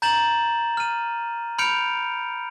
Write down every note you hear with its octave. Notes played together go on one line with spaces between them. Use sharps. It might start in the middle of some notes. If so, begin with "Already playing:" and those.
A#5 G6 A6 E7 F#7
F6 D#7
B5 F6 G6 C#7 D7 F7